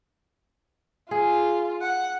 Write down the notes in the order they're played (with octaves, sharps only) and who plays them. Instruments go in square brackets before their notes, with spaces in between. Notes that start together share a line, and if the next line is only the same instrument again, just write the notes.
[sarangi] F4 [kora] G#4
[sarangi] F#5